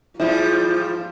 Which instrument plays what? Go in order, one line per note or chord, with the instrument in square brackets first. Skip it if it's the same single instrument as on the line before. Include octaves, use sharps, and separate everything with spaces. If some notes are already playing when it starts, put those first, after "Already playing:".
[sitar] G#2 F3 G3 [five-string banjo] E4 [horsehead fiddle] F4